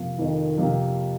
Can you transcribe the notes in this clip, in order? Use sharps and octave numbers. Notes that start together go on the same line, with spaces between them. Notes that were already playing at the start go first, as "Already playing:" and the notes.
Already playing: F2 C3 F3 A#3
F2 D#3
C3 F3 A#3